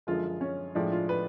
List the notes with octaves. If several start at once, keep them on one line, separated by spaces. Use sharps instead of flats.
F#2 D3 F3 G#3 F4
C#4
A2 F3 G#3 D4
F4
B4